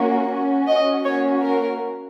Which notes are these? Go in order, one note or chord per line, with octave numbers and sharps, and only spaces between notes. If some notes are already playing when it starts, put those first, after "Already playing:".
Already playing: A#3 C#4 F#4
C#4 F#4
D#5
A#3 C#4 F#4 C#5
A#4